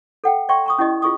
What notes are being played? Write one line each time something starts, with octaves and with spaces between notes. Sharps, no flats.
A4 F#5 G5
D5 E5 G5 C6 C#6
A#5 C#6 D#6
C#4 E4 G4 D5 D#5
F4 G#4 C#6 D#6